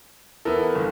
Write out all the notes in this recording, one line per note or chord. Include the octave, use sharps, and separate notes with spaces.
E3 B3 E4 A4 A#4
G1